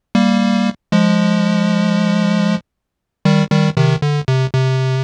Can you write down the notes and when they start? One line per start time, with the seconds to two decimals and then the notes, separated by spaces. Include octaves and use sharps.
0.15 G3 A#3
0.92 F3 G#3
3.25 D#3 G3
3.51 D#3 G3
3.77 C3 D#3
4.02 D3
4.28 C3
4.54 C3